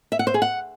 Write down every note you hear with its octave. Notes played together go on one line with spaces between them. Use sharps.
E5
F#5
C5
G#4
F#5